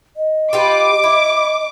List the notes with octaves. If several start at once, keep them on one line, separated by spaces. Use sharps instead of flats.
D#5
F4 G4 B4 D6
E4